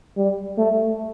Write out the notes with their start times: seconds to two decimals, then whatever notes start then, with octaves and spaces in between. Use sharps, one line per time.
0.17 G3
0.58 A3